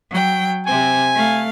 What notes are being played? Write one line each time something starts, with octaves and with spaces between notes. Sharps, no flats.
F#3 G5
C3 C4 G#5
A3 F5